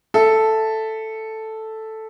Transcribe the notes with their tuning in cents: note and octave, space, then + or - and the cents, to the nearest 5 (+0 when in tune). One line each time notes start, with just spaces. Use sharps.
A4 +0 E5 +0